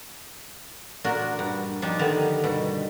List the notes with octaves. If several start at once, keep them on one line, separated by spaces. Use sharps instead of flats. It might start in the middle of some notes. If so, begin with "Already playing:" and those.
A#2 D4 F#4 A#4
G2
F3 D4 D#4 G4
D3 D#3 B3 G4 B5
G2 B2